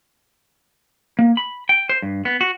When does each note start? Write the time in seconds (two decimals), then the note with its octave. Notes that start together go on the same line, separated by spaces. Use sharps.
1.19 A#3
1.37 B5
1.69 G5
1.89 C5
2.02 G2
2.25 B3
2.41 F#4